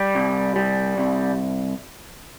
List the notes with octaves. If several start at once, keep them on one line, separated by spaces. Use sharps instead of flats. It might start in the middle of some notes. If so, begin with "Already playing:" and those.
Already playing: G3
C2
G3
C2